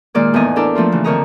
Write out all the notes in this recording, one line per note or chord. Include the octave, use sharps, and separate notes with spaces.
A#2 D#3 G#3 A#3 D5 F6
E2 A2 B3 D#4 D#5 G#5
D4 E4 A4 A#4 D5
F3 A3 A#3 F4
C#3 E3
F2 D3 A#4 C#5 D#5 A#5